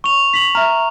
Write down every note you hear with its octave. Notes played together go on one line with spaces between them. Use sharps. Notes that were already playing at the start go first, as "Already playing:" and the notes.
C#6 F7
B6 F#7
E5 A#5 F6